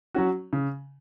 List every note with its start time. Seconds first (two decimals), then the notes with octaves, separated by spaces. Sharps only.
0.14 F#3 C#4 F#4
0.53 C#3